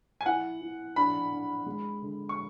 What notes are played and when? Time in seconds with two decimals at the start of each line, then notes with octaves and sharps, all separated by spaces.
0.21 G#5
0.26 E4 F#5
0.61 E4
0.96 D4 B5
1.32 D4
1.66 G#3
2.02 D3
2.29 C#6